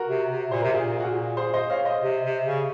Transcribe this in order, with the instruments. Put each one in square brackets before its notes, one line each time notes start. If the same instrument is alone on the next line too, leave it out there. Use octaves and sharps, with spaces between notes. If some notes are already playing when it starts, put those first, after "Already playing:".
Already playing: [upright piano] F#4 A#4
[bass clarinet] C3
C3
[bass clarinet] A#2 [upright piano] C5
[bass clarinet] C3 [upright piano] A#4
[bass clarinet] A#2 [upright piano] F4 G#4
[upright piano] F#4
F4 G#4
G#4 C5
C5 D#5
C#5 F5
C5 D#5
[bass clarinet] C3
C3
C#3